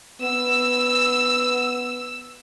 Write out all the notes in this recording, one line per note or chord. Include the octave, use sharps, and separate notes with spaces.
B3 E6